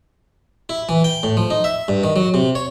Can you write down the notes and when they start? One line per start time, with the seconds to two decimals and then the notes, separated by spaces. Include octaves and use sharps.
0.69 E4
0.89 E3
1.04 G5
1.23 A2
1.37 F3
1.50 D#4
1.64 E5
1.88 G2
2.04 D#3
2.16 F#3
2.34 C3
2.55 C#5